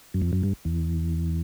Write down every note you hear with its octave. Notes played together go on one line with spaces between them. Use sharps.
F#2
F2
F#2
G2
E2